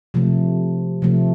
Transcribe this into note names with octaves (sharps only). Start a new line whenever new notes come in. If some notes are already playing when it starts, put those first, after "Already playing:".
C3 F3 A3
C3 F3 A3